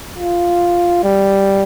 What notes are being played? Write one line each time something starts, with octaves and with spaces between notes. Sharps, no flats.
F4
G3